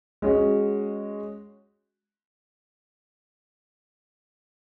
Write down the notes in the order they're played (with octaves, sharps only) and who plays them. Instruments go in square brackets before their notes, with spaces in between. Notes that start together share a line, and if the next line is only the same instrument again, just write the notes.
[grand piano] G#3 C#4 F#4